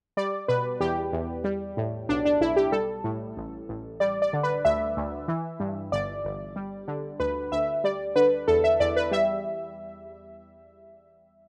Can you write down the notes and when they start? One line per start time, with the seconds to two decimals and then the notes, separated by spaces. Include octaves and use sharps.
0.17 G3 D5
0.48 B2 B4
0.80 E2 G4
1.13 E2
1.44 G3
1.77 A2
2.09 B1 D4
2.25 D4
2.41 B1 E4
2.56 G4
2.72 G3 A4
3.04 A2
3.37 A1
3.69 A1
4.00 G3 D5
4.22 D5
4.33 D3
4.43 B4
4.65 D2 E5
4.97 D2
5.28 E3
5.60 G2
5.92 G1 D5
6.25 G1
6.56 G3
6.88 D3
7.20 D2 B4
7.52 D2 E5
7.84 G3 D5
8.16 D3 B4
8.48 E2 A4
8.64 E5
8.80 E2 D5
8.96 B4
9.11 G3 E5